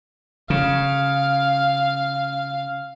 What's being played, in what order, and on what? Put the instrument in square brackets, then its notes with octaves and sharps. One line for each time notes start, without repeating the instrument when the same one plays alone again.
[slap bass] C#3 [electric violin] F5